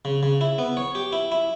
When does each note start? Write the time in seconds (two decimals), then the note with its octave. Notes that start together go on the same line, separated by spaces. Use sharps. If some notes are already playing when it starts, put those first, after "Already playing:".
0.05 C#3
0.23 C#3
0.41 E4
0.58 B3
0.77 C#5
0.95 G4
1.13 E4
1.32 E4